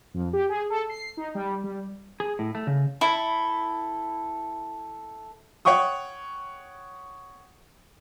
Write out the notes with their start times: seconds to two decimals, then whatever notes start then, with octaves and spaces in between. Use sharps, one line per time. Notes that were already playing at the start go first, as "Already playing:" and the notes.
0.14 F2
0.33 G4
0.49 G#4
0.70 A4
0.90 C7
1.17 D#4
1.35 G3
1.64 G3
2.20 G#4
2.39 A2
2.55 A3
2.67 C#3
3.01 E4 A4
5.65 C#5 F#5 G5 C#6 D#6